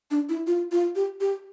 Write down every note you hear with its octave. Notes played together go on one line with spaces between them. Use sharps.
D4
E4
F4
F4
G4
G4